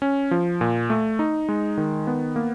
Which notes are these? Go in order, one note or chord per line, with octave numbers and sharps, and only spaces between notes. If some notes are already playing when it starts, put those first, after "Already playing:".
C#4
F3
A#2
A3
D#4
G#3
D#3
B3
A#3